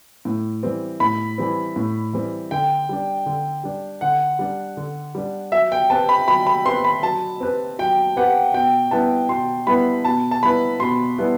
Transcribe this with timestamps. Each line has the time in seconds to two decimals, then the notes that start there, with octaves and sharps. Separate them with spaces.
0.25 A2
0.63 E3 G3 C4
1.00 A2 B5
1.38 E3 G3 C4
1.76 A2
2.13 E3 G3 C4
2.51 D3 G5
2.89 G3 D4
3.26 D3
3.64 G3 D4
4.01 D3 F#5
4.39 G3 D4
4.77 D3
5.15 G3 D4
5.52 F#3 E5
5.72 G5
5.90 C4 G4 B4 A5
6.09 B5
6.28 F#3 B5
6.47 B5
6.65 C4 G4 B4 C6
6.84 B5
7.03 F#3 A5
7.40 C4 G4 B4
7.79 F#3 G5
8.16 C4 G4 B4 F#5
8.54 B2 G5
8.91 G3 B3 E4 B4 A5
9.29 B2 C6
9.67 G3 B3 E4 B4 B5
10.05 B2 A5
10.31 A5
10.43 G3 B3 E4 B4 B5
10.80 B2 C6
11.18 G3 B3 E4 B4